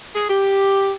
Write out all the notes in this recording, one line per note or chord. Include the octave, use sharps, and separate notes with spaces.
G#4
G4